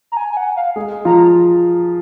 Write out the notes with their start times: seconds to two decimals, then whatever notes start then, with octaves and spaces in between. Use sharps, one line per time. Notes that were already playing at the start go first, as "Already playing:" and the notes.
0.12 A#5
0.17 G#5
0.32 G#5
0.37 F#5
0.57 F5
0.76 G#3 G#4
1.05 F3 F4 A#5